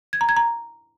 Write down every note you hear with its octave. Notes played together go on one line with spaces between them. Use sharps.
G#6
A#5
G#6
A#5